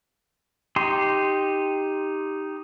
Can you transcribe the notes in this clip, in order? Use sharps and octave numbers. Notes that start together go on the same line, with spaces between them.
D#4 G4 C6